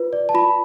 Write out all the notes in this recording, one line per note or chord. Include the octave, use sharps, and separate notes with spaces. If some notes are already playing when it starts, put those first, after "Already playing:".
Already playing: F4 B4
D5
A5
F4 B5